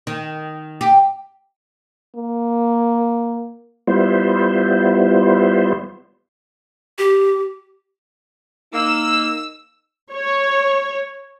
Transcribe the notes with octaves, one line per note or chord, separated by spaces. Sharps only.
D#3
G4
A#3
G3 B3 E4 F4 C5
G4
A#3 D#4 E6
C#5